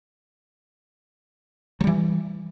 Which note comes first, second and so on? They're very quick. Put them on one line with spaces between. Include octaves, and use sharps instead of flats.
F#3 G3 E3